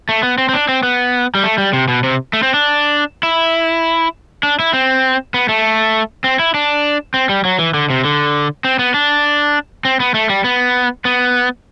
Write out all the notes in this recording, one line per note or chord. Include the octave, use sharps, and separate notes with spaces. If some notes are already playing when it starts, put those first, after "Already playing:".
A3
B3
C4
C4
D4
C4
B3
G3
A3
G3
C3
B2
C3
A3
C4
D4
E4
D4
E4
C4
B3
A3
C4
E4
D4
C4
G3
F#3
E3
D3
C3
D3
C4
B3
D4
C4
B3
A3
G3
B3
B3